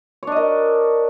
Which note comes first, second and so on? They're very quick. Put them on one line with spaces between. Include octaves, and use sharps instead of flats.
C#5 D4 D#5 A#4